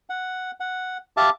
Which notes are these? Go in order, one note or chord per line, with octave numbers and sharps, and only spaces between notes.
F#5
F#5
G4 E5 F5 A5 D6